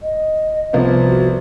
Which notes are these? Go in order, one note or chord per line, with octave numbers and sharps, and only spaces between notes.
D#5
C2 F3 B3
F#4